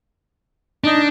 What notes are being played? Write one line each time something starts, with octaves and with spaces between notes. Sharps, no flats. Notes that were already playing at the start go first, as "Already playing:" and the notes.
D4 D#4